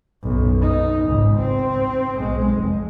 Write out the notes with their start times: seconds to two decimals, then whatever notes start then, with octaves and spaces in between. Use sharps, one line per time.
0.23 B1 F#2
0.62 D#4
1.07 G#1 C#2
1.39 C4
2.16 B1 G#3
2.53 F1